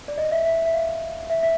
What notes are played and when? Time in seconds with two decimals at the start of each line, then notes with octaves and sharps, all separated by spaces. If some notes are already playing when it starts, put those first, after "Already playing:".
0.08 D5
0.18 D#5
0.31 E5
0.45 E5
0.66 E5
0.74 F5
1.30 E5
1.42 E5